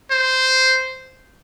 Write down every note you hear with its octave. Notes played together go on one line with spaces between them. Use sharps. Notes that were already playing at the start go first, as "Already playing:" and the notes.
C5